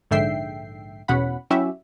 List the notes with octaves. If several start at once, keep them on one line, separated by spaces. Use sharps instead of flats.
A#1 G#2 D3 E5 G5 C7
E2 B2 C#4 F#5 B5
F#3 C#4 E4 F#4 G4 E5